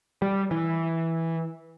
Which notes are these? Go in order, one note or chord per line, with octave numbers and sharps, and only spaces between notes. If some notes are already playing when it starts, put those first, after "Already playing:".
G3
E3